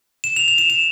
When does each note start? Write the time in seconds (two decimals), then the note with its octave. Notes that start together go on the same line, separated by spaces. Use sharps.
0.24 E7
0.36 F7
0.48 F7
0.58 E7
0.70 E7